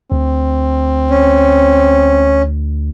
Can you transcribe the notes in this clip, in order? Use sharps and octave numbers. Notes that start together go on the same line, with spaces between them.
D2 C4
C#4